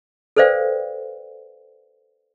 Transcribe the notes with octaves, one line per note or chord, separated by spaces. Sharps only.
A4 B4 C5 D5 F5 G5